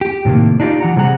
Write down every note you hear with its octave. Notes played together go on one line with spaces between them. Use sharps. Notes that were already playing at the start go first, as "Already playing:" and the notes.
G4
A2 C3 D#3 A#3
D4 D#4 F4 G4
E3 F#5 A#5
C3 G3 G#4 F#5 A#5